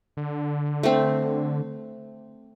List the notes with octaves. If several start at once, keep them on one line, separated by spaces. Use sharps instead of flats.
D3
A3 C4